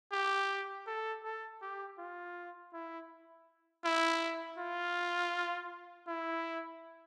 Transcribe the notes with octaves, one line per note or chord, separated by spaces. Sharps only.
G4
A4
A4
G4
F4
E4
E4
F4
E4